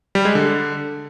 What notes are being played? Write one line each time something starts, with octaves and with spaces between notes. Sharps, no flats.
G3
G#3
D3